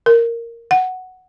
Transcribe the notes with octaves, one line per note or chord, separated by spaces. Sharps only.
A#4
F#5